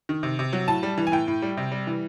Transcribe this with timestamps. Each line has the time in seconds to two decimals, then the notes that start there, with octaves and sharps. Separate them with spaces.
0.09 D#3
0.23 C3
0.39 C3
0.53 F#3
0.68 A2 A5
0.83 G3
0.98 E3
1.07 G#5
1.12 A2 G5
1.28 A2
1.42 G3
1.57 C3
1.72 G3
1.87 E3